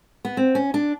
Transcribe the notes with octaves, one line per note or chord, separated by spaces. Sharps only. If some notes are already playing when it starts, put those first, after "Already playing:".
B3
C4
C#4
D4